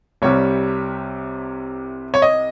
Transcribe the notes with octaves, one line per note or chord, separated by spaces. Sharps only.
C2 C3 G3 C#5
C#5
D#5